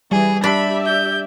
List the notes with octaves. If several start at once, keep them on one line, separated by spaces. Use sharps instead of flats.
E3 G3 G#4
D4 G4 D5 E5 B5
G6